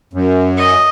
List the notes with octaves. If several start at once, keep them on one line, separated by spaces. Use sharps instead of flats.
F#2
D#5